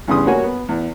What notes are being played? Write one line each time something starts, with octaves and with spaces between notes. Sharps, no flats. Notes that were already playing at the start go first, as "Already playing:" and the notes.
E2 G2 C#3 G#4 C6 D#6
G3 A#3 F#4 C#5 G#5
B3
E2